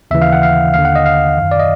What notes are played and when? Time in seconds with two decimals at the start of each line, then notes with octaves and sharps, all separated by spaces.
0.11 D#2 C#3 E3 E5
0.22 F5
0.33 F#5
0.43 F5
0.74 D#2 D3 F5
0.85 F#5
0.96 D#5
1.06 F5
1.37 F#2 D#3
1.51 D5
1.59 D#5